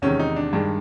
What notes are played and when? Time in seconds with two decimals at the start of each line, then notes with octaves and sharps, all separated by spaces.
0.02 E2 C3 D#3 G#3 C#4
0.19 D#4
0.36 D4
0.53 G2 D#3 G#3